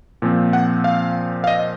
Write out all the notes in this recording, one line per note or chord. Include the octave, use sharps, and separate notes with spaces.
A#2 F3 C4
F#5
F5
F5
D#5